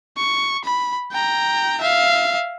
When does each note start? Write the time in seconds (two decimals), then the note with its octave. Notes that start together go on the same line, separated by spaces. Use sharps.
0.17 C#6
0.64 B5
1.12 G5 A#5
1.81 E5 F5